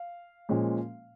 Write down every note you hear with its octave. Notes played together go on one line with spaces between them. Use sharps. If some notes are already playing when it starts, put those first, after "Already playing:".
Already playing: F5
A#2 F3 G#3 C#4